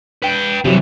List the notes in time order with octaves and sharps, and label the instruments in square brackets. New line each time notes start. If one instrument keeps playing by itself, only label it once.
[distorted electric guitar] B4 G5
[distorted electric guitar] C3 E3 [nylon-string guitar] F#3 G3